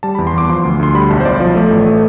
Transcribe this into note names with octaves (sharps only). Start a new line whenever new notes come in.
G3 A5
E2 B5
C6
E2 D6
F3 C6
D2
D2 C6
G3 B5
B1 A5
C5
B1 D5
F3
A3
A1
A3